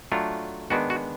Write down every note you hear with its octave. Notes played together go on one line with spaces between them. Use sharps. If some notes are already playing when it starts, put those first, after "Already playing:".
F#3 A3 D4 F4
D#3 G#3 B3 D4 F#4
F#4